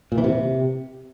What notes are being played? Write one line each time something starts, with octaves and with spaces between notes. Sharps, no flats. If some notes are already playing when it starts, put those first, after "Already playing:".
A#2
E3
C3